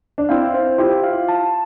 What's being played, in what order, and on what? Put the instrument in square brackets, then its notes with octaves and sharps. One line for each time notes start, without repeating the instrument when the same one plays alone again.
[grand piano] D4
[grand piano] C4 E4 [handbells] F5
[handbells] C5
[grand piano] E4 G4 [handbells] F4
[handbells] F5
A5